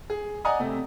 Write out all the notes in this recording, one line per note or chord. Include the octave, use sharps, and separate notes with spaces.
G#4
D5 D#5 F#5 G#5 A#5 D#6
C3 A3